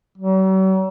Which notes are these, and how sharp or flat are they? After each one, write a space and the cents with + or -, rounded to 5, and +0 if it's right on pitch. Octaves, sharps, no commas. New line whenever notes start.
F#3 +45